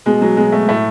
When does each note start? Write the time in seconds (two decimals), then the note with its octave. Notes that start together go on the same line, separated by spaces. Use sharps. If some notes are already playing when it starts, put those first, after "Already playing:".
0.06 B2 G#3
0.22 F#3
0.37 B2 G#3
0.52 A3
0.68 A2 A3